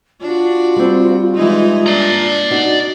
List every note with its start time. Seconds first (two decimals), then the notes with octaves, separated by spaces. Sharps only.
0.21 D4 F4 F#4
0.76 G3 C4
1.35 E3 G#3 D#4
1.86 D4 D5 A#5
2.51 D#4 F#4